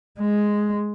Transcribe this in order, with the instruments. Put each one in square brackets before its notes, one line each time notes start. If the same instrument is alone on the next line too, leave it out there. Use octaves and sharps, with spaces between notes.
[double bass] G#3